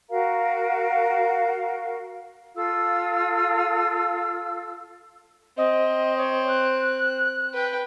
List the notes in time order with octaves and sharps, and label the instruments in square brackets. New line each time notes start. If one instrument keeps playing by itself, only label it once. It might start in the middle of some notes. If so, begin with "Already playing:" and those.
[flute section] F#4 A#4 F5 A#5
F4 A4 F5 E6
[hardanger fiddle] C4 [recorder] D#5
[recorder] C#5
F#6
[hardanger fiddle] B4 G5